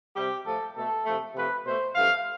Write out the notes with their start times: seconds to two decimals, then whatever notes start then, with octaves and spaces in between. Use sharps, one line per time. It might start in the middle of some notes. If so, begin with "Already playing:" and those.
0.16 C3 G3 G4
0.45 A2 F3 A3 A4
0.75 B2 A3 A4
1.06 C3 F3 A3
1.35 C3 F3 A3 B4
1.65 B2 A3 C5
1.95 G2 F3 A3 F5